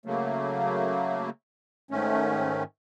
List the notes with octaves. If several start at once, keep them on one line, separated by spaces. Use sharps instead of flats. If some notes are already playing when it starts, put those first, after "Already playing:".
C#3 F#3 A3 A#3
G#2 D#3 A3 C#4